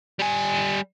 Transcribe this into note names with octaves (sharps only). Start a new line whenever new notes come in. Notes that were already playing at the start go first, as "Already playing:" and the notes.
G3 G#5